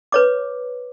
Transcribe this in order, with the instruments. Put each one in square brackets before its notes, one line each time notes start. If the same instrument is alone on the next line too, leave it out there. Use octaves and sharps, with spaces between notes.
[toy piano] B4 C#5 D6